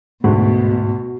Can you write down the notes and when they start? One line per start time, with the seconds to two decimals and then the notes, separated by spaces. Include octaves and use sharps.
0.24 D2 G#2 B2 F#4